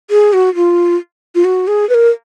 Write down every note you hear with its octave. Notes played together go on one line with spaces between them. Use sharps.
G#4
F#4
F4
F4
F#4
G#4
B4
A#4